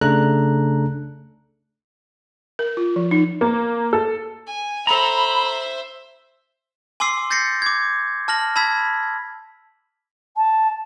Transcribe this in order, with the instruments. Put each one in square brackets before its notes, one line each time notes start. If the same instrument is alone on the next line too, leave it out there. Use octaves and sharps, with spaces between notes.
[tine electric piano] C#3 A3 D4 A4 A#5 F#6
[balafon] A#4
F4
F3
D#4
[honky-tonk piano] A#3
A4
[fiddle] G#5
[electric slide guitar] A4 A#5 [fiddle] C5 E5 [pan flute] B5
[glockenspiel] G#5 C6 D6 E6 C7
G6 A6 A#6 C7 C#7
D6 G#6
A5 F6 A#6 F#7
A5 B5 E6 G#6 B6
[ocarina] A5